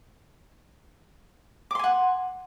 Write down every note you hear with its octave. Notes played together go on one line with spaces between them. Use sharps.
F#5 G#5 C6 D6